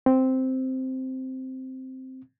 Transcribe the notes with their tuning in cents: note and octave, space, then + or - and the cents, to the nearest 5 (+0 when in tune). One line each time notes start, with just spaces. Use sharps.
C4 -5